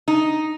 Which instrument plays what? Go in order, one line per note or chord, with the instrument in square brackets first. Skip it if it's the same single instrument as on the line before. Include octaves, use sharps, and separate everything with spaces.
[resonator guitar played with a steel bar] D#4